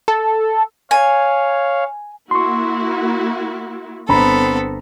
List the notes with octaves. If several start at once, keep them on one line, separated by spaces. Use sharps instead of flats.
A4
C#5 F5 G#5
A#3 E4 F#4 C6 C#6
G1 B3 C4 A4 A#5 B5